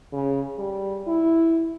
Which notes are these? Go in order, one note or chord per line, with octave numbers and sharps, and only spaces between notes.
C#3
G3
E4